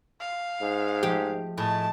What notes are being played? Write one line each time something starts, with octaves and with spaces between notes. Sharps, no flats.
F5
G#2
F3 G#3 A3 G4
A2 F#4 D#5 G#5 A5